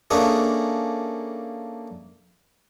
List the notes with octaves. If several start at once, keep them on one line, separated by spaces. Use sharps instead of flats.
A3 A#3 C#4 D4 G#4